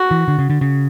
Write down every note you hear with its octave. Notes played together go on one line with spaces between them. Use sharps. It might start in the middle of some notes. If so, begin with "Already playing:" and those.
Already playing: F#4
E3
D3
C#3
D3
C#3